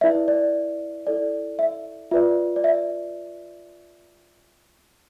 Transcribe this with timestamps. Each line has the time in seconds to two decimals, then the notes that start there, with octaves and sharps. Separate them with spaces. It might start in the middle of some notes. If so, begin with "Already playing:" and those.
0.01 E4 B4 D5 E5
0.28 D5
1.07 E4 A4 D5
1.59 E5
2.11 F4 B4 D5 E5
2.56 D5
2.64 E5